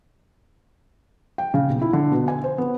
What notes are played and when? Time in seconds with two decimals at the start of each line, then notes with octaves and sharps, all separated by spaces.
1.38 G5
1.54 C#3
1.70 B1
1.81 E4
1.93 D3
2.12 B2
2.28 G#5
2.44 C5
2.58 B3